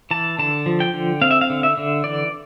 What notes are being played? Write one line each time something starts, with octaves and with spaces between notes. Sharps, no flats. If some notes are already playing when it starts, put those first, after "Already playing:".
E3 A5
D3 A5
F3
G5
D3
C4 F5
E5
F5
D3
E5
D3
E3 D5